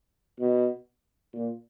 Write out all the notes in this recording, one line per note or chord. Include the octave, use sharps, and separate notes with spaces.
B2
A#2